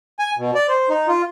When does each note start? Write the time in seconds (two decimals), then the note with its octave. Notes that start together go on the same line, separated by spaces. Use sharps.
0.19 G#5
0.38 B2
0.55 D5
0.69 C5
0.90 D#4
1.08 F4